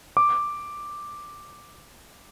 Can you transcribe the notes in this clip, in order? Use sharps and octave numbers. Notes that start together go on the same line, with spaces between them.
D6